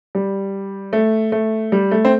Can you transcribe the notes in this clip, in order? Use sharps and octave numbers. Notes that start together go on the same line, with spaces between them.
G3
A3
A3
G3
A3
C4